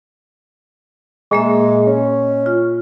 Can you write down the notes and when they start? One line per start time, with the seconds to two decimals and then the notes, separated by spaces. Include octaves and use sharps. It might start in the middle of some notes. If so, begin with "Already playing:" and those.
1.31 A#2 G#3 A#3 E5
1.87 C#4
2.46 F4